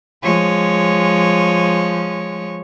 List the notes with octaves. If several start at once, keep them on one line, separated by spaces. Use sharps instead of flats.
F3 G#3 C#5